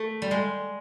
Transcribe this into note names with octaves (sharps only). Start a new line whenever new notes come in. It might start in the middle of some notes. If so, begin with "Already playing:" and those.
Already playing: A3
G3
G#3